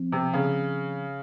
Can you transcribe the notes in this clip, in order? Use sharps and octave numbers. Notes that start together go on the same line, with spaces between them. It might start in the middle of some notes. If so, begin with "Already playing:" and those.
Already playing: F3 C4
C3
C#3